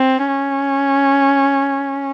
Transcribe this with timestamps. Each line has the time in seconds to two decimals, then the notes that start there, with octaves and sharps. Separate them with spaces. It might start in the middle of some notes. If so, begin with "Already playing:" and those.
Already playing: C4
0.28 C#4